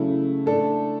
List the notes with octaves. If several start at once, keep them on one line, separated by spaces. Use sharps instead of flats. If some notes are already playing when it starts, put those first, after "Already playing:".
Already playing: C#3 F#3 A3 E4
A3 D4 A4